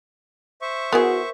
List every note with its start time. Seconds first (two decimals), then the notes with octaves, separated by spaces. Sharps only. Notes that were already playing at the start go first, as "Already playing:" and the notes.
0.62 C5 E5 C#6
0.93 B3 E4 F#4 G#4 A#4